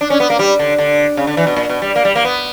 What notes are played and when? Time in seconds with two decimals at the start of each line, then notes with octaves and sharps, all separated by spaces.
0.01 D4
0.10 C#4
0.20 B3
0.30 A#3
0.39 G3
0.59 D3
0.78 D3
1.17 C#3
1.27 D3
1.37 E3
1.47 B2
1.56 A#2
1.69 B2
1.82 G3
1.96 A#3
2.05 G3
2.15 A#3
2.25 B3